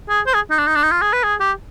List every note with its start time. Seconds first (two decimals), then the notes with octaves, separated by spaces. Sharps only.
0.09 G#4
0.26 C5
0.34 G#4
0.50 D#4
0.58 D4
0.67 D#4
0.75 D4
0.83 D#4
0.91 F4
1.02 G#4
1.13 B4
1.23 G#4
1.40 G4